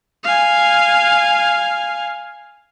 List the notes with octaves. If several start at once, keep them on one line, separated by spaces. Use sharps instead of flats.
F5 G#5